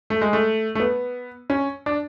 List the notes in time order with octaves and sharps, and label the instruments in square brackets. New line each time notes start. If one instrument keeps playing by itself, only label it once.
[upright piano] A3
G#3
A3
A3
B3
C#4
D4